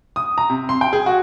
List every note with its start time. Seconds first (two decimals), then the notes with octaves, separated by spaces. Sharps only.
0.16 D#6
0.38 A#5
0.50 C3
0.69 C6
0.81 G5
0.93 G#4
1.06 F#4